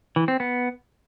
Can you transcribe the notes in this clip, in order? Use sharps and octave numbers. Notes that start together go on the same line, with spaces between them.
E3
C4
B3